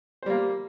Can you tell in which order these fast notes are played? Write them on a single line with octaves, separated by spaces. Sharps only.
C5 G3 A#3